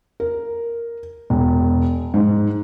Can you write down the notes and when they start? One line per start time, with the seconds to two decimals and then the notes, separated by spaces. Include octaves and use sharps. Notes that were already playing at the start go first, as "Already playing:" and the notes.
0.20 A#4
1.30 E1
2.14 G#2